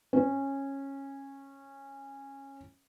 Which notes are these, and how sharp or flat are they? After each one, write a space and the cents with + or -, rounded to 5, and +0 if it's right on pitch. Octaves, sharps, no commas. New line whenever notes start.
C#4 -15